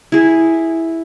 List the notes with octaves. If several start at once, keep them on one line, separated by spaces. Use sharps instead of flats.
E4 G#4